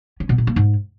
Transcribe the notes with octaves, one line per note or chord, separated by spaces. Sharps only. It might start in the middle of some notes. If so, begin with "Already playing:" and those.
C#4
B2
A#2
A#3
G#2